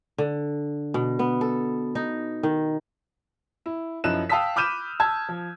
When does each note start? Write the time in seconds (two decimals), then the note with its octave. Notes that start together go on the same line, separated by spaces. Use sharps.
0.18 D3
0.94 B2
1.19 B3
1.41 A4
1.95 D#4
2.43 D#3
3.66 E4
4.04 F#2 F3 D#4 E4 F#6 E7
4.29 F5 G5 A5 D#6 E6 B6
4.56 B5 D6 F6 G6 D#7 E7
5.00 A5 E6 G#6
5.29 F3